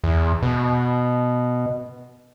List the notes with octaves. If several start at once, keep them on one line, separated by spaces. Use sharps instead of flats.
E2
B2